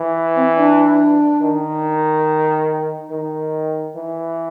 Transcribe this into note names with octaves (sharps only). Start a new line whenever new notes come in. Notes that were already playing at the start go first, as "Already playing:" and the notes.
Already playing: E3
C4
D4
D#3
D#3
E3